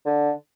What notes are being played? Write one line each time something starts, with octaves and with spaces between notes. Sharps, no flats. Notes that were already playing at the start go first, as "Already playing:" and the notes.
D3